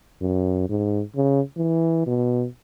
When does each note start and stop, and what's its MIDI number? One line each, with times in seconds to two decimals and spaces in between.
0.21 0.68 42
0.69 1.02 44
1.16 1.41 49
1.57 2.05 52
2.06 2.45 47